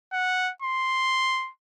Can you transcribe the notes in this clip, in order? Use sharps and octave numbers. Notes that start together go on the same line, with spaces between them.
F#5
C6